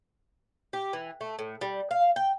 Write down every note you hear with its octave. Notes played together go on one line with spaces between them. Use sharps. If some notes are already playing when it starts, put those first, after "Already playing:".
G4
E3
A3
A2
G3
F5
G5